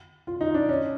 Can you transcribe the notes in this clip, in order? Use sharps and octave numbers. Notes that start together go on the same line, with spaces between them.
F4
D#4
D4
C#4